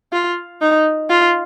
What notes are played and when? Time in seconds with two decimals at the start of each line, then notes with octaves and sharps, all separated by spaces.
0.13 F4
0.61 D#4
1.09 F4